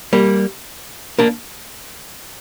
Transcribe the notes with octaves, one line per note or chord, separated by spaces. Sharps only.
G3 A#3
A#3 D4